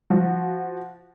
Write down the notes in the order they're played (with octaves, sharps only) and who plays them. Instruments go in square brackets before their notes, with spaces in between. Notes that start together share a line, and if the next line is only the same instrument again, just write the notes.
[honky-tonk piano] F3 F#4